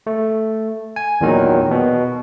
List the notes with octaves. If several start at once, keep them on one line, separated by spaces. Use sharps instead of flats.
A3
G#5
E2 A#2 D#3 F#3
B2